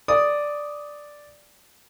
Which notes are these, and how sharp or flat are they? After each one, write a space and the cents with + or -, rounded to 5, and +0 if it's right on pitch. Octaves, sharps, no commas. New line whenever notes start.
D5 +0 D#6 +0